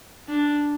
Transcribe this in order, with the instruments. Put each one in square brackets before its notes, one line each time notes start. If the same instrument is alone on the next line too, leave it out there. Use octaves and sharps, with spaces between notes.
[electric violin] D4